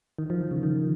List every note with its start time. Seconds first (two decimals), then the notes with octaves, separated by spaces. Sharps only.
0.18 D#3
0.30 F3
0.40 D#3
0.51 C#3
0.57 F3
0.63 D#3